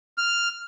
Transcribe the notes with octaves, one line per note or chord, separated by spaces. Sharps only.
F6